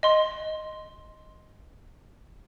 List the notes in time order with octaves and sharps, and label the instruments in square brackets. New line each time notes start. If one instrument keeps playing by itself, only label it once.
[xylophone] D#5 C6